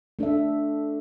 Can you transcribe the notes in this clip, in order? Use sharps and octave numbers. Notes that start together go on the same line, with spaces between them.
A3 D4 A4 E5